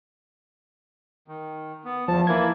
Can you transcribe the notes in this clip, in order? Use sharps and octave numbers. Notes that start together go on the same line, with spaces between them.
D#3
B3
E2 F3 A5
E3 A#3 E4 G#6